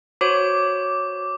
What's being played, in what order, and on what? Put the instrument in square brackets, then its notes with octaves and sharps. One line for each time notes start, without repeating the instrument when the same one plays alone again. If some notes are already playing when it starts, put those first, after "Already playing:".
[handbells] F#4 C5 C#5 [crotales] D6